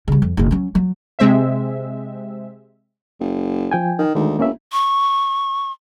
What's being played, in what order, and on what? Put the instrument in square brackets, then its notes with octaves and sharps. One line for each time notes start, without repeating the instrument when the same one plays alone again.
[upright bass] C#3 G3
F2
F#1 B1
F#3 C#4
F#3
[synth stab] C3 G#3 C4 E5
[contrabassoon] F#1
[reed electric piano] F3 G5 G#5
[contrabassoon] D#3
[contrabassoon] D2 [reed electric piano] D#3 G#3 D#4
[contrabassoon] E1 [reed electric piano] A#3 C#4 E5
[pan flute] C#6